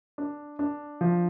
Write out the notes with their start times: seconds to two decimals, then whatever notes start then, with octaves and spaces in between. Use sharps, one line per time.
0.18 D4
0.59 D4
1.01 F3